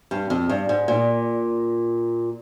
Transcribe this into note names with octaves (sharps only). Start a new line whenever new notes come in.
G2
F2
G2
G#2
A#2